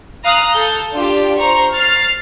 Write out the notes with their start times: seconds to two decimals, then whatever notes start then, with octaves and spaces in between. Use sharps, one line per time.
0.24 F5 A#5 D#6 F#6
0.52 A4 G6
0.91 D4 F4 G4
1.37 C5 A#5 C#6
1.73 F6 A6 C7